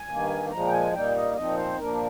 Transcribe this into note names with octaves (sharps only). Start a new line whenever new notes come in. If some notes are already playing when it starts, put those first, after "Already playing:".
Already playing: G#5
G2 D#3 A#3
A#2 F3 G#3 A#5
G5
G#5
A#2 G3 A#3 D#4 G5
D#5
A#2 F3 C4 D#4 D#5
C5
A#2 F3 A#3 D4 A#4